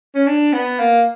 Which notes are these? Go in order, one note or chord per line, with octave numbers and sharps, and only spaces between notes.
C#4
D4
B3
A#3